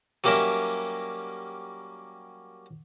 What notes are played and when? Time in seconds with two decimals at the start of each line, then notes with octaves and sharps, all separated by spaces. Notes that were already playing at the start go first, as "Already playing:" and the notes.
0.24 F#3 G3 A#3 C#4 A#4 E5